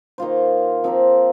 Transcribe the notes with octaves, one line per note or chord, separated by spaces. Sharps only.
D#3 A#3 F4 C5
F3 C4 G4 A#4